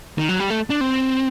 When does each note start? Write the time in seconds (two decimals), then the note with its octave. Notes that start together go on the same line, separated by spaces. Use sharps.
0.18 D#3
0.29 F#3
0.39 G3
0.50 A3
0.70 D4
0.81 C4